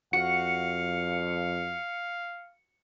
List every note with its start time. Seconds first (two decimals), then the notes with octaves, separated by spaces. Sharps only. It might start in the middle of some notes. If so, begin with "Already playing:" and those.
0.13 F2 F#4 F5 C#7